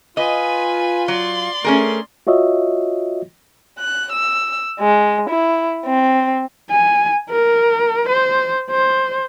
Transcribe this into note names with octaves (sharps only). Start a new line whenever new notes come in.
F4 B4 D#5 G#5
F#3 D5 C6
A3 C#4 G#4 A#4
F4 F#4 C#5 D#5 E5
F#6
E6
G#3
E4
C4
G#5
A#4
C5
C5